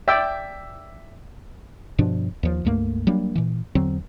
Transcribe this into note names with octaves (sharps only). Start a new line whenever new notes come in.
D5 E5 G5 D6 E6
G2 B2 F3 D4
D#2 F3
C#2 G2 A3 A#3
F#3 G3 A#3 D4
A#2 E3
E2 D3 F#3 C4